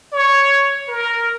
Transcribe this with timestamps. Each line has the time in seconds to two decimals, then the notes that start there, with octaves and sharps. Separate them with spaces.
0.13 C#5
0.88 A#4